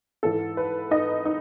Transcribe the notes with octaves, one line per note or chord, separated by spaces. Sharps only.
G#2 E3 A4
B4
D#4 D#5
D#4